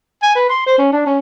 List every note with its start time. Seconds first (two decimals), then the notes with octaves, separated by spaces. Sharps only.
0.22 G#5
0.36 B4
0.50 C6
0.66 C5
0.78 C#4
0.93 D4
1.06 C#4